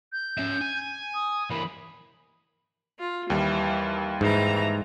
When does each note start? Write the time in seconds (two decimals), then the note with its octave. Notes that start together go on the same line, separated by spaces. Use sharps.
0.12 G6
0.38 C#4 E5
0.61 G#5
1.14 D#6
1.51 E3 A#3 B5
2.99 F4
3.30 D#2 E3 G3
4.21 G#2 E3 A#5